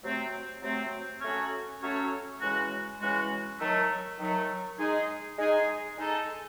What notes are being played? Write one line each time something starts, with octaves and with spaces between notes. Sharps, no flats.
C3 F#3 A3 C4
C3 F#3 A3 C4
F#3 A3 C#4 F#4 C#5
F#3 A3 C#4 F#4 C#5
C#3 E3 G#3 C#4 F#4
C#3 E3 G#3 C#4 F#4
D#3 F#3 A3
D#3 F#3 A3
G#3 D#4 G#4
G#3 D#4 G#4
G#3 D#4 A4